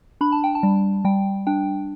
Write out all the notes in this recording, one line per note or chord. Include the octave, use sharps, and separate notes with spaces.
D4 B5
A5
G5
A5
G3
G3 G5
D4 G5